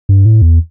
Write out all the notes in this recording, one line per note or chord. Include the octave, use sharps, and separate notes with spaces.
G2
A2
E2